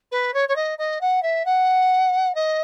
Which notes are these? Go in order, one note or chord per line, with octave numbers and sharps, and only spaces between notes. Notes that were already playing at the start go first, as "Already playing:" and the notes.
B4
C#5
C#5
D#5
D#5
F#5
E5
F#5
D#5